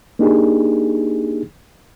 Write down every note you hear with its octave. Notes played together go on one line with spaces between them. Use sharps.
A#3 D4 D#4 G4 G#4